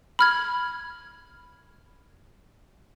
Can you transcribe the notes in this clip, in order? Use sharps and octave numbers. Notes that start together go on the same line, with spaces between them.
B5 F6 G#6